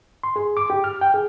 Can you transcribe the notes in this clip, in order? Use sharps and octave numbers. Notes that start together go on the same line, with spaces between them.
C6
G#4
D6
G4
F6
G5
G#4